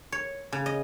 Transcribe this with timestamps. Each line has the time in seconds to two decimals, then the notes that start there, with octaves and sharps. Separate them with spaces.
0.12 C#5
0.52 C#3
0.66 D#5